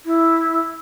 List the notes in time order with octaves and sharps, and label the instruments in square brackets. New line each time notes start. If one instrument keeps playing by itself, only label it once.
[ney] E4